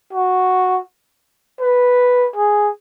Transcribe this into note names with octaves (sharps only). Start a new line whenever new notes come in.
F#4
B4
G#4